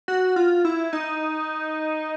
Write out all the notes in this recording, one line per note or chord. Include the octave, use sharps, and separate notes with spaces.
F#4
F4
E4
D#4